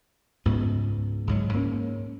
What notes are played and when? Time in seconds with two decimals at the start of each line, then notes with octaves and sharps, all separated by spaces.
0.45 C#2 G#2 B3
1.27 C#2 G#2 F#3
1.53 G#2 A#3 C4 C#4